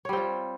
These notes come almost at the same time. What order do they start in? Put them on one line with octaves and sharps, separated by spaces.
C#5 G3 C4 F4